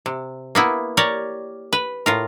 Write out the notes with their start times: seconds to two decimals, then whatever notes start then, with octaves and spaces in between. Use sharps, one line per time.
0.06 C3
0.55 A#3 B3 E4
0.97 G4 A#4 C#5 D5
1.73 B4
2.06 A2 F4 A#4